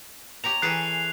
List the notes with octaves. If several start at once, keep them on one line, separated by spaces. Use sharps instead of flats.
G4 C#5 A#5 F7
E3 G#4 A4 F#6 C7